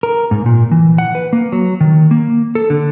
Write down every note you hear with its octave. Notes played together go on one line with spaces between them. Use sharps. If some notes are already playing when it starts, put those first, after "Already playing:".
A#4
G#2
A#2
E3
F#5
B4
A#3
F#3
D#3
A#3
A4
D3